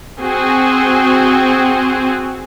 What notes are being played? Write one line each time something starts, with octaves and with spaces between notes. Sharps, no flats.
C4 F#4 G#4